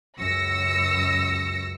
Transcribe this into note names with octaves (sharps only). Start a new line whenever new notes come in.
C#2 F#2 E6 A#6 C#7